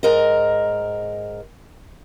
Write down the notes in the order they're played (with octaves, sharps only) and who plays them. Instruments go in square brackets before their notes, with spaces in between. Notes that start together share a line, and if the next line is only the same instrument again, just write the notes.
[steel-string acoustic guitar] G#2 A#4 D#5